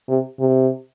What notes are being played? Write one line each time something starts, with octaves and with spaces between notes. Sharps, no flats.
C3
C3